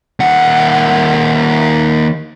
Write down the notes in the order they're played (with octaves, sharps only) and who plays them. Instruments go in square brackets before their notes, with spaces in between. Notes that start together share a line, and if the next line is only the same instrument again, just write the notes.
[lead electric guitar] D#2 F#5